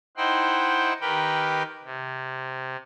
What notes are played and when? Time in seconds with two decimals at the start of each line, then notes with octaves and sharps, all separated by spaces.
0.17 D#4 E4 C5 F#5 G5 C6
1.01 D#3 G4 A#4 B4 G5 B5
1.84 C3